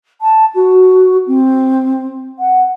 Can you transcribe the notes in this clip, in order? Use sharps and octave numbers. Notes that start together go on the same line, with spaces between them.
A5
F#4
C4
F#5